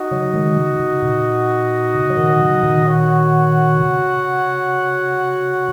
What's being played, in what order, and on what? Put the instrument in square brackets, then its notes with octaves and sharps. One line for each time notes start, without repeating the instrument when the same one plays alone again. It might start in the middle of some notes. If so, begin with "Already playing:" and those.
Already playing: [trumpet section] D#4 F#4 D#5
[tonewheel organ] C#3 F#3
D#3 G#3
C#3
C#3
A#2
C#3
F#3
A#2 D#3
C#3 F#3
A#2 D#3
[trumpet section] F#4 C#5 F#5
[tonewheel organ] C#3